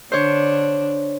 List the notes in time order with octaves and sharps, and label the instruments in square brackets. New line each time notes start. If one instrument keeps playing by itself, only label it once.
[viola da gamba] D3 D4 [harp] C5 C#5